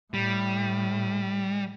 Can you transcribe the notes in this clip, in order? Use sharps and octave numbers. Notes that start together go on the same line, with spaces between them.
A2 G3